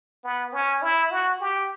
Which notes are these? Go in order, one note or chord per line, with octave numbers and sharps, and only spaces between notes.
B3
C#4
E4
F#4
G4